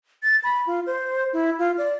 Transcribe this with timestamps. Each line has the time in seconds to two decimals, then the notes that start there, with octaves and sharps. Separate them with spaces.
0.23 A6
0.44 B5
0.67 F4
0.86 C5
1.33 E4
1.59 F4
1.78 D5